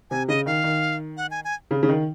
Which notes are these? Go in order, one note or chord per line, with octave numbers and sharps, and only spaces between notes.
C3 G#5
C#3 D#5
D#3 F5
D#3
F#5
G#5
G#5
C#3
C#3
D#3